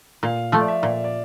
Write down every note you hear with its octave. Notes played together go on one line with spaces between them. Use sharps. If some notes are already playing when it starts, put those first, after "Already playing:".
A#2 F5
F3 A3 E5
D5
E5
A#2 D5
D5